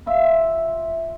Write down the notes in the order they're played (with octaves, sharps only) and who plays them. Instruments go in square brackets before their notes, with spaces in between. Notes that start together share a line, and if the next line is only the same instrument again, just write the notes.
[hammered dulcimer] F4 E5